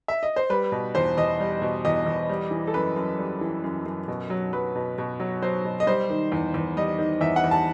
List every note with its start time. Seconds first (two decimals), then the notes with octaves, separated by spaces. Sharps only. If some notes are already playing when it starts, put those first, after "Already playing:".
0.08 E5
0.23 D#5
0.36 C5
0.50 G3 B4
0.72 B2
0.95 E2 C5
1.17 E2 D#5
1.40 G3
1.62 B2
1.85 E2 D#5
2.06 E2
2.29 G3
2.51 E3
2.67 A4
2.74 F#2 B4
2.96 F#2
3.18 G3
3.41 E3
3.64 F#2
3.86 F#2
4.08 B2
4.30 F#3
4.53 F#3 B4
4.76 B2
4.98 B2
5.20 F#3
5.42 F#3 C5
5.65 B2
5.80 D#5
5.87 G3 C5
6.10 D#3
6.32 E2
6.54 E2
6.77 G3 D#5
6.98 D#3
7.21 E2 E5
7.36 F#5
7.44 E2
7.51 A5